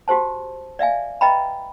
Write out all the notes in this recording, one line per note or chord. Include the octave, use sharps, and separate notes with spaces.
F#4 G4 C5 A5
D5 E5 F5 G#5
B4 D#5 E5 G5 A#5 B5